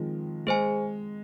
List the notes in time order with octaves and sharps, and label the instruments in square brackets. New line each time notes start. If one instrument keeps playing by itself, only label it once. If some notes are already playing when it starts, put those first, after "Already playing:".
Already playing: [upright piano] D#3 F3 G#3 C4
[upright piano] G#3 [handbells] G#4 C5 G#5